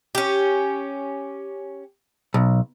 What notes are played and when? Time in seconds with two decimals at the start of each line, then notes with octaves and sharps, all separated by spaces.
0.15 C#4 G4
2.34 B1